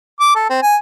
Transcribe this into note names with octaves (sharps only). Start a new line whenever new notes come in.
D6
A4
C4
G#5